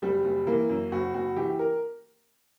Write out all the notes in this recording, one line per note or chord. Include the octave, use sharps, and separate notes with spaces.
F#1 G3
F#1
E3 A#3
F#2
F#1 F#4
F#1 F#4
E3 G4
A#4